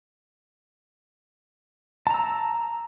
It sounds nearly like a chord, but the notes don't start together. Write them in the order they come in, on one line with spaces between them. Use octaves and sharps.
A5 A#5 E6